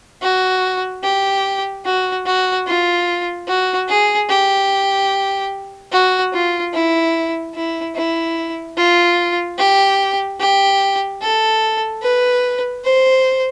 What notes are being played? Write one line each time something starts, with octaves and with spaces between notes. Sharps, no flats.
F#4
G4
F#4
F#4
F4
F#4
G#4
G4
F#4
F4
E4
E4
E4
F4
G4
G4
A4
B4
C5